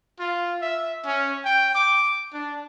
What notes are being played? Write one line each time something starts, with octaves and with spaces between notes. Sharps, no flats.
F4
E5
C#4
G5
D6
D4